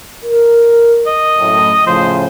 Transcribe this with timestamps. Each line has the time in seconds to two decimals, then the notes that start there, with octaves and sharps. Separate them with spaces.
0.24 A#4
1.07 D#5
1.38 F#2 A2
1.86 A2 C#3 F3 C5